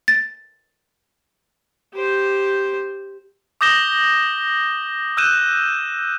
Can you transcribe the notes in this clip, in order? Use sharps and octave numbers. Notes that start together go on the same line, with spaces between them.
A6
G4 C5
D6 D#6 G6 A#6 E7 G7
E6 F#6 G6 D#7 E7